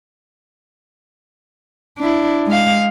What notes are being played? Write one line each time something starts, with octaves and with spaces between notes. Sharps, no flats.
D4 E4
G#3 F5